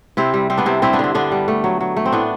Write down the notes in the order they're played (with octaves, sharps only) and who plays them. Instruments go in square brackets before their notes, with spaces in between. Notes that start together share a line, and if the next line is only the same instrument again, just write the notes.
[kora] C3 C4 E4
G3
G3 C4
B3 D4
C3 C4 E4
G2 C4 E4
B3 D4
D3 C4
D3 B3 D4
G3
A3
F#3
F#3
A3
C4
A2 B3 D4